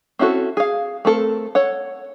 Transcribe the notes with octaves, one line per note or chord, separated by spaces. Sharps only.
C4 C#4 E4 F#4 A4
G#4 F5
A3 C4 A4 A#4
A4 C#5 F#5